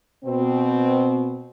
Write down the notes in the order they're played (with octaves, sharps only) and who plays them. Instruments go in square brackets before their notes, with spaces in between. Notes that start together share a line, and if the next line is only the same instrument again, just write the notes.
[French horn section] B2 C4